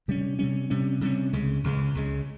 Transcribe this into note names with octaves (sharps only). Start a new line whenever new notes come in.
C3 G3 C#4
C3 G3 C#4
C3 G3 C#4
C3 G3 C#4
C#2 C#3 G#3
C#2 C#3 G#3
C#2 C#3 G#3